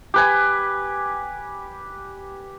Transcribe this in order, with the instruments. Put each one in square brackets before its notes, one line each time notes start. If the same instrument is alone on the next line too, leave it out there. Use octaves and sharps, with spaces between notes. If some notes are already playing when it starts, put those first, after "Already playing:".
[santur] G4 B4 G#5